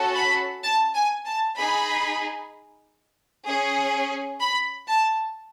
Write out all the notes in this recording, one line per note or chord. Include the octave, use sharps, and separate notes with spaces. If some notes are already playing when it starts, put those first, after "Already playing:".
Already playing: C#4 F#4 A4
B5
A5
G#5
A5
D#4 G#4 B5
C#4 G#4
B5
A5